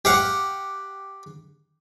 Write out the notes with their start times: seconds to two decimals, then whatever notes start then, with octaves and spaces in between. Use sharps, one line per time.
0.05 G4 F5 F#5